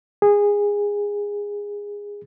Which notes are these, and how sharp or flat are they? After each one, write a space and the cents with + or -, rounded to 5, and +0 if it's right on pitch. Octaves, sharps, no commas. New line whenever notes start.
G#4 -20